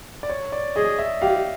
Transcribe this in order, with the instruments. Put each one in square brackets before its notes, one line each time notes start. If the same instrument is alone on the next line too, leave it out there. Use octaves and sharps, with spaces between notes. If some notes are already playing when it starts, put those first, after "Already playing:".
[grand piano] D5
C#5
D5
[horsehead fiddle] G#4 [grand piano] D#5
[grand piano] E5
[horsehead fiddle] G4 [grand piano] F5